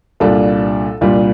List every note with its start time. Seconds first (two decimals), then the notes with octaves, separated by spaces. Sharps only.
0.20 C2 A#2 G3 D4 F4 A4
1.01 C2 A#2 G3 D4 F4